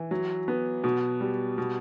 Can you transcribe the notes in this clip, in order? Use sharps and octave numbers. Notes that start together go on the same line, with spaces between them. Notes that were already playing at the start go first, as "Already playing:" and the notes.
Already playing: E3
F#3
B3
B2
G3
B2